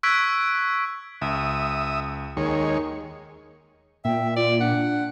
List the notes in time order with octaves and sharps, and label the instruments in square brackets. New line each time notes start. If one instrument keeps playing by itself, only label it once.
[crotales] C#6 E6 F#6 G#6 B6 D7
[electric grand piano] C#2 [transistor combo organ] E5 D#6
[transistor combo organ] D#2 G#3 C#5 [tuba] D#3
[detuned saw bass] A#2 [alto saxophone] E5 [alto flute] G5
[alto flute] F4 [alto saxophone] D5
[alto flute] D4 [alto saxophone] F#5